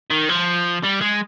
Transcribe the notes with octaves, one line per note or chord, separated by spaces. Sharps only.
D#3
F3
G3
G#3